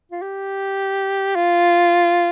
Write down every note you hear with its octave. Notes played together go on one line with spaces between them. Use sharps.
F4
G4
F4